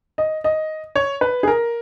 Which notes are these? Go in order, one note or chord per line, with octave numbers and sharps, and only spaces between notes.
D#5
D#5
C#5
B4
G#4
A#4